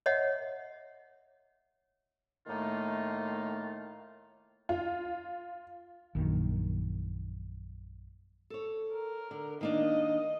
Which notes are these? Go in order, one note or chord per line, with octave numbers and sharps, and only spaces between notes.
C#5 D#5 E5 F#5
A2 D#3 A3 A#3 D#4 F4
F4
A#1 F#2 D#3
A4 C#5
A#4
D3
D#3 A#3 D4 D#5